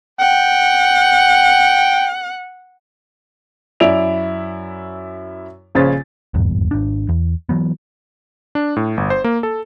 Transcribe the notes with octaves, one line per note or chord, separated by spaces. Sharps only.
F#5 G5
F#2 E4 D5 D7 F7
A#1 C#3 C#4 C5 A6
D#1 G#1 E2 G2
G#1 D4
E2
E3 F#3 B3
D4
A2
G1
C5
A#3
A4